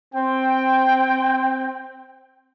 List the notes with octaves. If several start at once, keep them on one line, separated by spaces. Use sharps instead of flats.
C4 G5